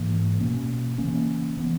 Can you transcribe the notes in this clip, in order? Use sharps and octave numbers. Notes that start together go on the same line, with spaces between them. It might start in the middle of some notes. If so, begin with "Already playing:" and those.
Already playing: G#2 E3 A#3
B2 A#3 C#4
C#3 E3 A#3 C#4
E3 B3